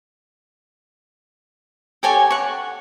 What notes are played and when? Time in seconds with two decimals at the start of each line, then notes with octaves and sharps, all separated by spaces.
2.03 G4 A4 C#5 G#5
2.30 F#5 C#6